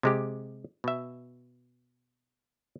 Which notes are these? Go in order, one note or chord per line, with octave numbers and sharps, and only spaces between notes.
C3 G#3 G4
B2 E5